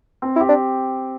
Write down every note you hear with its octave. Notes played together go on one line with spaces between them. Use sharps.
C4
E4
G4
D4